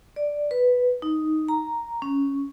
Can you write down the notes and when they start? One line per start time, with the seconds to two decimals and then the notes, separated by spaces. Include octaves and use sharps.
0.16 D5
0.51 B4
1.02 D#4
1.49 A#5
2.02 C#4